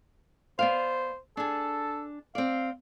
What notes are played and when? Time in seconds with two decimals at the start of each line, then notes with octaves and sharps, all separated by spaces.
0.59 B3 C5 D5 F5
1.37 D4 G#4 A4
2.35 C4 D5 F5